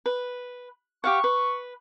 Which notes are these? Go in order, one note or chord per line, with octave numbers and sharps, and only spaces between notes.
B4
G4 F5 F#5 C#6
B4